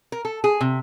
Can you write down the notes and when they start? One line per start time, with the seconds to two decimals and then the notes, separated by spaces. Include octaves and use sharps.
0.12 A#4
0.25 A4
0.44 G#4
0.61 C3